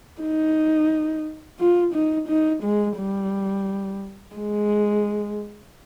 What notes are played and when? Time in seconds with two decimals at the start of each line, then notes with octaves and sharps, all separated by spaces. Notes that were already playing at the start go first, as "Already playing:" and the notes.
0.21 D#4
1.59 F4
1.93 D#4
2.28 D#4
2.63 G#3
2.97 G3
4.35 G#3